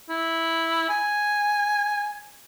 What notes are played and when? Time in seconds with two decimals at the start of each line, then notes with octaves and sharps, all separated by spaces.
0.09 E4
0.89 G#5